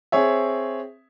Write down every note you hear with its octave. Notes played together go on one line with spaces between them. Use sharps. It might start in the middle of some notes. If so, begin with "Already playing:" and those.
C4 G#4 C#5 E5